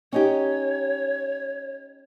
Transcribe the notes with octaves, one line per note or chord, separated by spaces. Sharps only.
C#4 D#4 G4 C#5